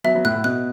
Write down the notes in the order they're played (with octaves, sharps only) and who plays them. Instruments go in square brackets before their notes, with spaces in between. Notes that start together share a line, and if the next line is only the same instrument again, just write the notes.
[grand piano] F#3 B3 [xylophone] E5
[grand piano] F#3 B3
[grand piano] A2 [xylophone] F#6
[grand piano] A2
[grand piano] B2 [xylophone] F#6